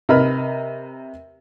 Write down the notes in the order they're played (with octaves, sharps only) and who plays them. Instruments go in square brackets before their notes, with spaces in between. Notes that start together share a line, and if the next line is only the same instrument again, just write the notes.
[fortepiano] C3 A#4 B4 D#5 B5 F6